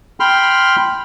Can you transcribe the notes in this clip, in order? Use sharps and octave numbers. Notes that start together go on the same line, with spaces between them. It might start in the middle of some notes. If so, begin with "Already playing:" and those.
G5 B5 C6 F6